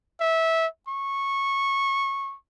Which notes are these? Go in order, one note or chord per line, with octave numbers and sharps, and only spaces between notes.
E5
C#6